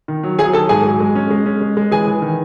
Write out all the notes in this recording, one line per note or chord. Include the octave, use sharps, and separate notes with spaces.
D#3
F#3
F#3 G#4 G#5
D#3 A4 A5
G#2 G#4 G#5
F#3
G#3
C#4
G#3
C#4
G#3
G#3
E3 G#4 G#5
E3
D#3